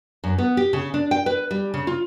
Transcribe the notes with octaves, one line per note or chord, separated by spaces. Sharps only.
F#2
B3
G4
C#3
D4
G5
B4
G3
C#3
F4